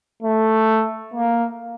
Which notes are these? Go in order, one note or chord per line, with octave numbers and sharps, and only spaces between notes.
A3
A#3